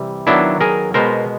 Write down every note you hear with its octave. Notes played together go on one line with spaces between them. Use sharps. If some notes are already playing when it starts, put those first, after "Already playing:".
Already playing: C3 E3 G3
D#3 F#3 B3 D4 E4
G#4 A#4
B2 G#3 B3 A#4 C5